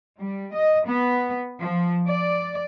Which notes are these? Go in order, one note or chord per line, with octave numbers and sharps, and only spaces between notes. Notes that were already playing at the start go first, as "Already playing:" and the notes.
G3
D#5
B3
F3
D5